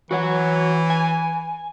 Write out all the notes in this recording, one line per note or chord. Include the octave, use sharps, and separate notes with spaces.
E3 F#4 C#5 F#5
G#5